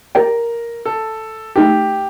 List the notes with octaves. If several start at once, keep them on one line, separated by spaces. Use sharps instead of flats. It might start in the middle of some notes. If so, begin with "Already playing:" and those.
G4 A#4 D5 G5
A4
A3 D#4 G4 A4